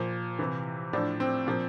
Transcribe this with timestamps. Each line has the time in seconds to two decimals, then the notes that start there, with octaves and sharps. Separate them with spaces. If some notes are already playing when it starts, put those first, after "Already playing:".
Already playing: A#2 F3
0.39 C3 E3
0.93 A2 F3 D4
1.20 C4
1.47 A#2 F3